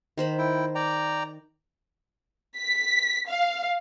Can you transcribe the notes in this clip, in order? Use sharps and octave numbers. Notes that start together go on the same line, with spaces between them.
D#3 C5 B5
E4 G5
D5 G5 A#5
B6
F5